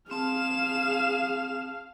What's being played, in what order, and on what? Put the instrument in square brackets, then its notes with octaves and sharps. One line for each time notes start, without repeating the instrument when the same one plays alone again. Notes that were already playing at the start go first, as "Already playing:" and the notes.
[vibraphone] C4 A5 [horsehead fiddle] G#4 [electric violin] F5 F6 [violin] E7